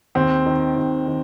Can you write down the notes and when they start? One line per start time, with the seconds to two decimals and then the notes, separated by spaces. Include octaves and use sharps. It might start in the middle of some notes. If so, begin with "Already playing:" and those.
0.15 D#2 C4
0.46 D#3
0.76 D#2
1.08 D#3